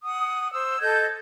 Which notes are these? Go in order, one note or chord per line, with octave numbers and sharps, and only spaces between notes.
F#5 D#6
C5 E6
A4 D#5 G6 G#6